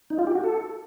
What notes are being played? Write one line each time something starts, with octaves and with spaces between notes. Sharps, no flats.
D#4
F4
G4
F#4
A4